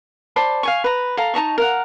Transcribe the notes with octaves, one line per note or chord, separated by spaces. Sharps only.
C5 D5 A5 B5
F5 G#5 C#6
B4 A#5
A4 F5 A#5
D#4 A5 A#5 C#6
A#4 F5 F#5